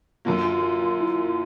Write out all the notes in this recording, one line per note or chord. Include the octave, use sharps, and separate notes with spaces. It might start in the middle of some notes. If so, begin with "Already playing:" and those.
F#2 D3 F#3 A#3 F4
F4
F4
F4
E4
F4